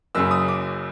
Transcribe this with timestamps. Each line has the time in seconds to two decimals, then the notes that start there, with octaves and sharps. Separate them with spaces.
0.15 F#1 F#2 C#3 E6
0.31 D#6
0.48 D6